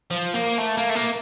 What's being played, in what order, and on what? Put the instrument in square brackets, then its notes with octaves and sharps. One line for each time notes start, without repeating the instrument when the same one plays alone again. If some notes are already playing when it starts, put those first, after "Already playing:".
[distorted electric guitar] F3
A#3
A3
A#3
A3
A#3